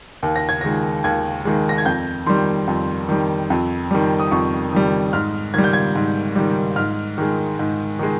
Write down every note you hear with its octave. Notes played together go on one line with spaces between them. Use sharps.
D#2
A#6
G#6
D#3 G#3 A#6
D#2 G#6
D#3 G#3
A#6
G#6
F2 G6
D#3 G3 C6
F2
D#3 G3
F2
D#3 G3
D#6
F2 C#6
D#3 G3
G#2 F6
D#3 G3 G#6
G6
G#6
G#2
D#3 G3
G#2 F6
D#3 G#3
G#2
D#3 G#3